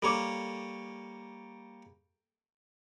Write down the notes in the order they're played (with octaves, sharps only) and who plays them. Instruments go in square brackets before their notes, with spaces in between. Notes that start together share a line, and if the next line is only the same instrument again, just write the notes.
[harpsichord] G3 A#3 C#5 [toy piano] A4 B5 D6